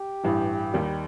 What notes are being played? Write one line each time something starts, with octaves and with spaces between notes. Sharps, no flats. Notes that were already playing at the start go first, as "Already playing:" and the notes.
Already playing: G4
A1 G2 E3
D#2 D#3 G3